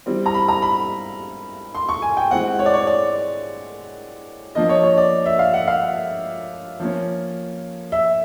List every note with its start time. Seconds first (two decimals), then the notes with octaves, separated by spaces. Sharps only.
0.06 E3 G3 C4
0.26 A#5
0.34 B5
0.48 A#5
0.62 B5
1.75 C6
1.89 C#6
2.02 G#5
2.17 G5
2.31 E3 G#3 C4 F#5
2.59 C#5
2.66 D5
2.74 C#5
2.87 D5
4.55 F3 A#3 D4 D#5
4.69 C#5
4.83 C#5
4.98 D5
5.26 E5
5.39 F5
5.54 F#5
5.68 F5
6.80 F3 A#3 C#4
7.92 E5